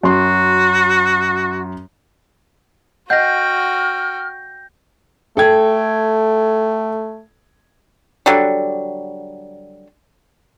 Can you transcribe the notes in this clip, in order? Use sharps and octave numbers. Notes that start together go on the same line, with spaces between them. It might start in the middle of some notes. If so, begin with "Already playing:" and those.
F#2 F#4 C6
F#4 D#5 F#5 G5 F6 G6 A#6
A3 A4 G5 G#6
D3 F#3 G3